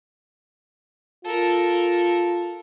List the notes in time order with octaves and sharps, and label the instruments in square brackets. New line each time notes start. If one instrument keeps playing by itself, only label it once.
[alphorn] F4 [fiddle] A4 A#4